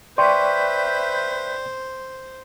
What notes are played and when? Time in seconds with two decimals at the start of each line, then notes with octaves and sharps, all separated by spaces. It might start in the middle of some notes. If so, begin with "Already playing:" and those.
0.18 B4 C5 D5 E5 G5 C6 C#6 G6